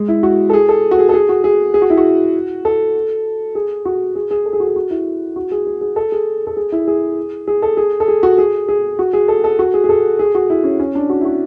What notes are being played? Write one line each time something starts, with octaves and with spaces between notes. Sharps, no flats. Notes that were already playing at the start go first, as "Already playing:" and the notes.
Already playing: G#3
E4
F#4
A4
G#4
A4
F#4
G#4
A4
G#4
F#4
G#4
G#4
F#4
E4
F#4
A4
G#4
F#4
G#4
G#4
A4
G#4
F#4
G#4
F#4
E4
F#4
G#4
G#4
G#4
A4
G#4
A4
G#4
E4
G#4
G#4
A4
G#4
A4
G#4
F#4
G#4
G#4
F#4
G#4
A4
A4
F#4
G#4
G#4
A4
G#4
F#4
E4
C#4
C#4
D4
F#4
E4
F#4